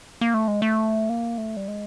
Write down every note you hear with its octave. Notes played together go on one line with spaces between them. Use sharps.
A#3
A3
G#3
A3
A#3
A3
G3
G#3